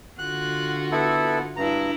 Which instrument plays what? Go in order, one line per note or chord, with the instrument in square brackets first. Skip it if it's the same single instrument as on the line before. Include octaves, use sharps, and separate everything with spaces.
[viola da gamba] D3 F4 F#4 [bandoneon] F#6
[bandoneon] B3 E4 A4
[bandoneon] G2 A#5 [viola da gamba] D4 E4